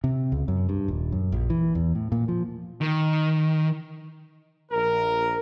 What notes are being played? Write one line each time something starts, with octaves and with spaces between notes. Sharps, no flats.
C3
C#2
F#2
G2
D#1
F#2
A#1
E3
E2
A2
A#2
F3
D#3
A#1 A#4